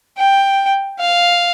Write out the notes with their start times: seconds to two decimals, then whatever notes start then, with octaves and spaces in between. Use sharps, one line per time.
0.17 G5
1.00 F5